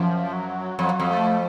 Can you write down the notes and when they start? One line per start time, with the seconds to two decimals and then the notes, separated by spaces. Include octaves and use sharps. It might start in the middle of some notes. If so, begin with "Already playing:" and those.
Already playing: F#2 F3
0.33 F#3
0.79 F2 F#3
1.00 F2
1.10 A3